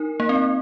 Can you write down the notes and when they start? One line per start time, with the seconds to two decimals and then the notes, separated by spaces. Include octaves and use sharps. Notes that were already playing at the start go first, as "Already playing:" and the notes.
Already playing: D#4 A#4
0.20 A#3
0.29 C4